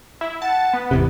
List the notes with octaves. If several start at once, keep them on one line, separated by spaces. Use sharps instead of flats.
E4
F#5 A5
B3
G#1 E2 C3